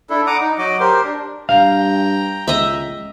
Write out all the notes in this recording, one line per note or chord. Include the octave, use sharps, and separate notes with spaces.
D4 E4 A4
F#5 A#5 D6 D#6
D#4
F#3 F#4 D#5 D6
G4 A#4 C5
D4
G2 F5 G5 A#5
C#2 D#5 E5